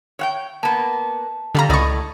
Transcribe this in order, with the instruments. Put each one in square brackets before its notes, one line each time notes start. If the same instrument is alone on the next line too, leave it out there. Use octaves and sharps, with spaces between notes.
[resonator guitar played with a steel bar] C#5 F#5 G5
[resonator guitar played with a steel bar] A#3 B3 [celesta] A5
[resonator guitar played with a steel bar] F2 G3 [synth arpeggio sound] D3 F5 A#5
[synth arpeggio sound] C#2 C#6 [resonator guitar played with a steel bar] A2 D5 D#5